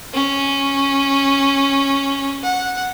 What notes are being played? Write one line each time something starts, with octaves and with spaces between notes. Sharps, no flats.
C#4
F#5